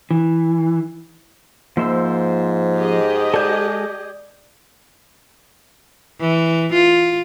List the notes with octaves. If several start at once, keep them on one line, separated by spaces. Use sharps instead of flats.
E3
G#2 F3 A#3 C5 E6
G4 G#4 D#5
G#3 A4 D5 G6
E3
F4